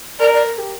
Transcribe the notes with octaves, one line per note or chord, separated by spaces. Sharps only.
A#4 D5
D5
A#4
G4